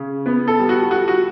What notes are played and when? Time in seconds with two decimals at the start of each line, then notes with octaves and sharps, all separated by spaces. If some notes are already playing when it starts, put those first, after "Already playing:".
Already playing: C#3
0.26 B3
0.48 A4
0.59 G3
0.69 F#4
0.91 G3 F#4
1.08 F#4